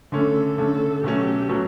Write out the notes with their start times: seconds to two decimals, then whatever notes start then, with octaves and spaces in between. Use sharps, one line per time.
0.12 D3 A3 C#4 A4
0.58 D3 A3 C#4 A4
1.03 B2 F#3 A3 C#4 G4
1.49 B2 F#3 A3 C#4